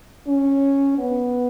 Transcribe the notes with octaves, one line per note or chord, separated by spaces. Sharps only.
C#4
B3